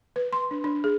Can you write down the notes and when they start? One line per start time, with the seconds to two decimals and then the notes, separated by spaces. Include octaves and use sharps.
0.16 B4
0.33 C6
0.51 D4
0.64 D4
0.84 G#4